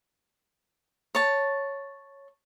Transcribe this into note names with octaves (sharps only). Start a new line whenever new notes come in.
C#5 A5